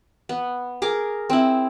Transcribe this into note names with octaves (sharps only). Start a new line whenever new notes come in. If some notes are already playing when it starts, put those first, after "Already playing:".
B3
G#4 A#4 D6
C4 E4